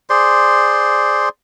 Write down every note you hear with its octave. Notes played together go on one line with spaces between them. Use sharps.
G#4 C5 D5 C6